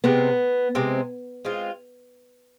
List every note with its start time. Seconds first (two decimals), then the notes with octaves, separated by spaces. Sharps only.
0.04 C3 G#3 B3 C4
0.75 C3 G#3 C4
1.45 G#3 C4 F4